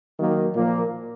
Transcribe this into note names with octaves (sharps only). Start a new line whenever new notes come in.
D#3 F#3 A#3
A#2 F3 A#3